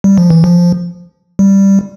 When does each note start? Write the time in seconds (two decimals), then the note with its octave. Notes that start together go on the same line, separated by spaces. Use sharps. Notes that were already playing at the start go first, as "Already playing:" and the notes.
0.04 G3
0.18 F3
0.30 E3
0.44 F3
1.39 G3